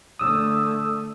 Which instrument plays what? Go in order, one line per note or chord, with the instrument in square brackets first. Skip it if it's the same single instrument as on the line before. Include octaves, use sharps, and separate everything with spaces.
[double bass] D3 A3 [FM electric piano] D#6 E6